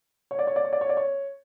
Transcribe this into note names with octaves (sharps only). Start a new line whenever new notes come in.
C#5
D5
C#5
D5
C#5
D5
C#5
D5
C#5